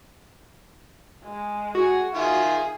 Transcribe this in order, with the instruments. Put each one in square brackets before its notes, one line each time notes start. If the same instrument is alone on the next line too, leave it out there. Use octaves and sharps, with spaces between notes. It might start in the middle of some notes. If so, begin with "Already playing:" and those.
[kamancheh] G#3
[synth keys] F#4 [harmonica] G#4
[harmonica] D#3 F4 E5 [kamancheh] G#4